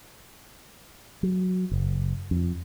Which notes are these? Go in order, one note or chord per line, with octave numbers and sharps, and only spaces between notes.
F#3
F#1
F2